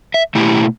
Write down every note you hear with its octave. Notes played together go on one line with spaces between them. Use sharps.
E5
B2 A3 E4 G4